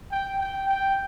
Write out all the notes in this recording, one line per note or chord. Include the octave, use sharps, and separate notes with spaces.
G5
G5
G5